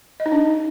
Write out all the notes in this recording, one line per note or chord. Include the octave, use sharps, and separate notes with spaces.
D#5
D#4
D4